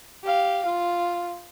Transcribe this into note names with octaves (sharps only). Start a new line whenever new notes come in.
G4 F5
F4